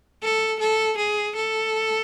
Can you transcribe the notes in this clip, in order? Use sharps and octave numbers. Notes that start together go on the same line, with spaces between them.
A4
A4
G#4
A4